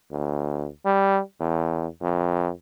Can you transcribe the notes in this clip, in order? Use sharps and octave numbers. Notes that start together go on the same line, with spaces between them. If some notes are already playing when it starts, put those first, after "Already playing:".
D2
G3
E2
F2